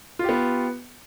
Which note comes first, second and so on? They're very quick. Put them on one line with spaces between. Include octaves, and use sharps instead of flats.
F4 G4 B3